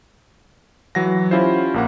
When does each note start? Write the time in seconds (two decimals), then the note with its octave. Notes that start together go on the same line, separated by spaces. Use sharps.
0.95 E3 F#3 F#5 A#6
1.31 C#4 E4 F4 G4 C5
1.74 A#1 A#3 F#5